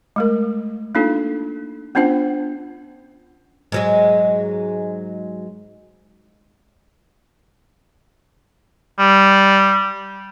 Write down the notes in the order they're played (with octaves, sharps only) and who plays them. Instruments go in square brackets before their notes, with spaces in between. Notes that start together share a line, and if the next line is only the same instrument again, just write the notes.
[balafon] G#3 A3 A#4
A#3 D4 D#4 F4 A4
B3 C#4 D4 F4 C5 F#5
[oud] G#2 F#3 G#3
[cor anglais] G3